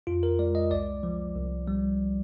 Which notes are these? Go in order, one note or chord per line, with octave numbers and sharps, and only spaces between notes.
F2 F4
A#4
G#3 D5
D#5
C2 D5
F3
C2
G3